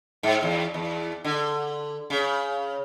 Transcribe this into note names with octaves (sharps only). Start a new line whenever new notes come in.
G#2
E2
E2
D3
C#3